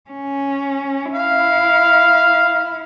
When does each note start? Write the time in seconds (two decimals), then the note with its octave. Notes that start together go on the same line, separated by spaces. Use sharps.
0.10 C#4
1.14 E4 F5